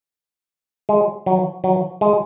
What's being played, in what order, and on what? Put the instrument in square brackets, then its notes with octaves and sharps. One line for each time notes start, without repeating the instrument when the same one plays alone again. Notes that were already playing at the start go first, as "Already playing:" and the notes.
[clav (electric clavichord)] G#3
F#3
F#3
G#3